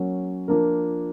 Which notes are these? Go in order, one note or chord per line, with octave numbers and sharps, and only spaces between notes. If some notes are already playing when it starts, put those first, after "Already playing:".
Already playing: F#3 A#3 C#4
F3 A#3 D4 F4 A#4